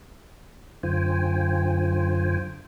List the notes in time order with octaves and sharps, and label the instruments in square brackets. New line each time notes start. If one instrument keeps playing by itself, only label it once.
[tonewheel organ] F#2 D3 F4 C5 G5 G#5